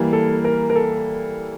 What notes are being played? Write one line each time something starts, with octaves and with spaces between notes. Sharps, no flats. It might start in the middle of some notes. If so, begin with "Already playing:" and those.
Already playing: E3 G3 A#3
A4
A#4
A#4
A4